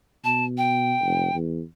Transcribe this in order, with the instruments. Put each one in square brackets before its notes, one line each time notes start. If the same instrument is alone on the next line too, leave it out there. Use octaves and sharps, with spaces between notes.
[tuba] B2 [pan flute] A5
[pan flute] G5
[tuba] F1
E2